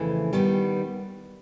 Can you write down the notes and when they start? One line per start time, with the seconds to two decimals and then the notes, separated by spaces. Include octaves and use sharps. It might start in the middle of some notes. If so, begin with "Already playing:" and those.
Already playing: F2 C#3 E3 A3
0.33 D#3 G3 B3